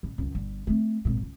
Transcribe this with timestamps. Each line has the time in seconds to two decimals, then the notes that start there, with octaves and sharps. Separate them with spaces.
0.03 A1
0.18 C#2 F#2
0.35 G1
0.67 A3 C4
1.05 G#1 A#2
1.22 C#2